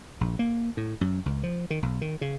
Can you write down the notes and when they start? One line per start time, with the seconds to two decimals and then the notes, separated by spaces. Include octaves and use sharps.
0.21 A#1
0.39 A#3
0.77 A2
1.01 F#2
1.26 C#2
1.43 F3
1.70 D#3
1.82 B1
2.01 D#3
2.21 C#3